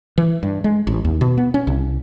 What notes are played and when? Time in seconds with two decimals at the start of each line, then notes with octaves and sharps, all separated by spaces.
0.18 E3
0.43 G2
0.64 G#3
0.87 A1
1.05 D#2
1.21 B2
1.37 B3
1.54 C#4
1.67 C2